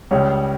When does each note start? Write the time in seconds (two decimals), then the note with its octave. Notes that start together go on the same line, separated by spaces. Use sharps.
0.11 C#2 C#3 G3 C#5